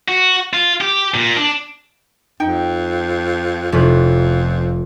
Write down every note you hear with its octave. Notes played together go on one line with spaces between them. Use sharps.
F#4
F4
G4
A#2
D4
F2 D#4 G5
F1 F2 C#4 E4 B4